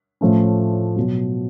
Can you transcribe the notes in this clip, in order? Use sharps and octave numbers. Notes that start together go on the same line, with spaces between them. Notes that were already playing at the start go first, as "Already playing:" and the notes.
A2 F3 A3 C#4
B2 F#3